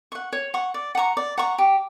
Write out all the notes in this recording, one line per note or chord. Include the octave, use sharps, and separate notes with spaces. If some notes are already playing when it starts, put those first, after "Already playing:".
F#5 C#6
C#5
F#5 C#6
D5
F#5 A#5 C#6
D5
F#5 A#5 C#6
G4